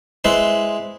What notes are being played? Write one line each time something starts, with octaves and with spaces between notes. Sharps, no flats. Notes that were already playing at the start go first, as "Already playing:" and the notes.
G#3 E4 B4 C5 C6